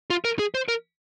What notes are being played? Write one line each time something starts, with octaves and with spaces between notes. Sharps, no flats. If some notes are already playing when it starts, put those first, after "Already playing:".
F4
A#4
G#4
C5
A#4